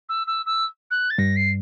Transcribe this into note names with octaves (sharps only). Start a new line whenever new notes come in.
E6
E6
E6
F#6
A6
G2 A#6
C7